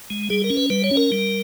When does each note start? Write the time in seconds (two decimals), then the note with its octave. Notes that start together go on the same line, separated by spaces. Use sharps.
0.10 G#3
0.30 G3 G#4
0.44 A#4
0.50 C#4
0.57 B4
0.70 G3 B4
0.84 C#5
0.91 C#4
0.97 A#4
1.12 G3